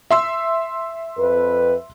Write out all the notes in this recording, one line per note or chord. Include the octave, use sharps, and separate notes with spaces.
E5 C6 E6
F2 B4